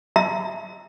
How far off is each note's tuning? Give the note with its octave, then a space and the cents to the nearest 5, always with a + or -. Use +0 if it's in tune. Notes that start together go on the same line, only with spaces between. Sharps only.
E5 +0 A#5 +0